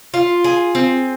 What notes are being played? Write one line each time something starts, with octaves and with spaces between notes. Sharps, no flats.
F4
G#4
C4